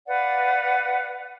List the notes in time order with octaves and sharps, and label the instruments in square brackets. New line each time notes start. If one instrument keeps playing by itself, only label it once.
[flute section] B4 D5 F5 F#5